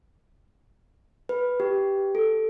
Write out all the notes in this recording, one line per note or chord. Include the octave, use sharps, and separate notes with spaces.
B4
G4
A4